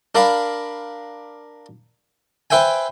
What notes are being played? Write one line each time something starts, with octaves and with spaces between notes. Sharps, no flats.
D4 A#4 D5 F5 B5
B4 C5 E5 G5 G#5